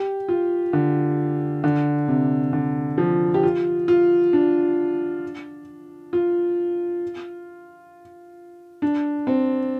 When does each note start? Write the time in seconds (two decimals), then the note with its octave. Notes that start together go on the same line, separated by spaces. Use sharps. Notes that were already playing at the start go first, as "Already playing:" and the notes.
Already playing: G4
0.28 F4
0.73 D3
1.64 D3
2.08 C3
2.53 D3
2.98 F3
3.34 G4
3.43 F4
3.88 F4
4.33 D4
6.13 F4
8.82 D4
9.27 C4